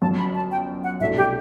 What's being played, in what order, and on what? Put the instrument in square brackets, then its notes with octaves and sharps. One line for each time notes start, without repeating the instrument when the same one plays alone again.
[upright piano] G1 F#2 F#3 [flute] A5
[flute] B5
A5
G5
F#5
[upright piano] C2 B2 A3 D4 F#4 [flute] E5
[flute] G4